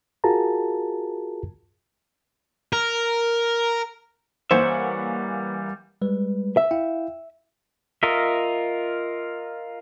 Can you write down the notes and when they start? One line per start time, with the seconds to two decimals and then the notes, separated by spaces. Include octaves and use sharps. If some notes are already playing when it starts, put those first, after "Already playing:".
0.24 F4 F#4 G#4 A#4 A5 A#5
2.73 A#4
4.51 E3 G3 A#3 C5 C#5 E5 F#5
6.02 G3 G#3 B4
6.57 E5
6.71 E4 F5 G5
8.03 F4 A#4 D#5 E5